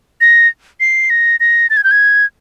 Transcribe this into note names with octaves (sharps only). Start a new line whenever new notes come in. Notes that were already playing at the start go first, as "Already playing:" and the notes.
A#6
C7
A#6
A#6
A6
G#6
G6
G#6